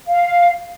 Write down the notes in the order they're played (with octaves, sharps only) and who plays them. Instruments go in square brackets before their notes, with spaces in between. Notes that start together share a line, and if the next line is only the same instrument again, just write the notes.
[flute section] F5